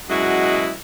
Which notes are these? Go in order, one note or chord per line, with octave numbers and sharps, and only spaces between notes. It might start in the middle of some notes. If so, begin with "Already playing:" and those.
F#2 B2 G#3 E4 F#4 D#5